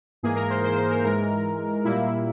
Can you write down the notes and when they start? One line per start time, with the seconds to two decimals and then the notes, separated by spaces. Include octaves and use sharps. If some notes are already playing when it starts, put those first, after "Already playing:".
0.23 G#2 E3 A#3 G#4
0.36 A#4
0.50 C5
0.64 C5
0.76 C5
0.90 A#4
1.03 G#2 E3 G#3 A#4
1.84 A#2 G3 A#3 E4